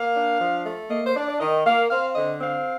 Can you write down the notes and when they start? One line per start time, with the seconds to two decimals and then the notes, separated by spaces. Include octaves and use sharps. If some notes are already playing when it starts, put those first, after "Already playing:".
Already playing: A#3 F5
0.15 D4
0.40 F3
0.65 A3
0.90 A#3 D#5
1.05 C5
1.15 D4 D5
1.28 D5
1.39 D#3 D#5
1.65 A#3 F5
1.90 C4 F5
2.15 D3 D#5
2.40 C4 F5